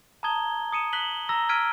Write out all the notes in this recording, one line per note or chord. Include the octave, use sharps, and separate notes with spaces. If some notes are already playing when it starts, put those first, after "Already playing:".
A5 A#5 D#6 G#6 G7
D#6 C#7 D#7 E7
F#6 B6 F#7 G7
A#5 E6 A#6 G7
E6 F6 G#6 B6 D7 D#7